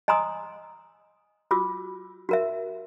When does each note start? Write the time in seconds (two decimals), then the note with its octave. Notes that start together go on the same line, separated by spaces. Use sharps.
0.08 D#5 G#5 A#5 C6 D#6 E6
1.51 F4 F#4 D6 E6
2.29 F#4 A#4 E5